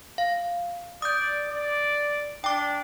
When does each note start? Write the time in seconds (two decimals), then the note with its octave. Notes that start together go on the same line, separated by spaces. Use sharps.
0.18 F5
1.02 D5 D#6 G6
1.50 D5
2.44 D4 G5 D6